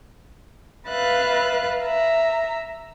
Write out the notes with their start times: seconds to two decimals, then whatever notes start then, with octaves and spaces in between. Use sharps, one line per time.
0.89 B4 E5 F5 F#6 A6
1.82 E5 A#5